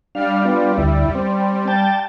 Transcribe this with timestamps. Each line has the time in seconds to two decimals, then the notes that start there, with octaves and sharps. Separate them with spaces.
0.15 G3 D4 F5
0.45 B3 D4 F4
0.78 D2 E4
1.15 C4
1.67 G5 A5